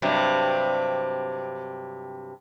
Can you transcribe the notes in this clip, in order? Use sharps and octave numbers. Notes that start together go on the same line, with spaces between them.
G2 C3 F#3